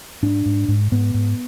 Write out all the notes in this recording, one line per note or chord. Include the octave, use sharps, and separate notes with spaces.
G#2 D4
G#2
G#2
G#2 B3
G#2